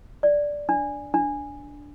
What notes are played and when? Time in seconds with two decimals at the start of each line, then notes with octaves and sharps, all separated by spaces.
0.23 D5
0.69 D4
1.14 D4